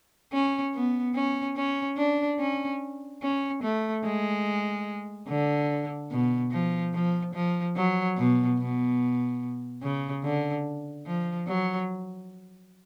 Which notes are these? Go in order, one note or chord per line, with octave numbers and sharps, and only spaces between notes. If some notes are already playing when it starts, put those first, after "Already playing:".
C#4
B3
C#4
C#4
D4
C#4
C#4
A3
G#3
D3
B2
F3
F3
F3
F#3
B2
B2
C#3
D3
F3
F#3